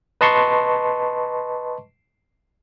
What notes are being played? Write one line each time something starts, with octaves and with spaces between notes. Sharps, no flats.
B4 D#5 A5 C6 C#6